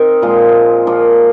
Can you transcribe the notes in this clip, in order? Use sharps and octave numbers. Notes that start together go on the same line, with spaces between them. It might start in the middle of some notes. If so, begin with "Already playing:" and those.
Already playing: C4 D#4 A#4
A#2 F3 G#3
F3 A#3 F4